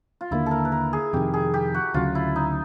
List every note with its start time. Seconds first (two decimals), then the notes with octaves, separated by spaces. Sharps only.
0.21 F4
0.31 D#2 D3 G3 A#3 E4
0.46 A4 A#4
0.65 B4
0.72 A#4
0.93 G#4
1.13 F2 C3 D#3 G4
1.34 G#4
1.54 G4
1.74 F#4
1.94 D2 C#3 F#3 F4
2.15 E4
2.36 D#4